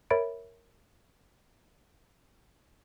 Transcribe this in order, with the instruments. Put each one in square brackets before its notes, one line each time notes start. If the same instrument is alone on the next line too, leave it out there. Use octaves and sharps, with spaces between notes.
[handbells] A#4 C#5 E5 B5 A6 D7